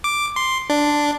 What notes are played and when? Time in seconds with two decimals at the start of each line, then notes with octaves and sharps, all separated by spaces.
0.04 D6
0.36 C6
0.70 D4